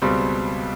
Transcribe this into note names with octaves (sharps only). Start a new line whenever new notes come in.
C#2 B2 G3 C4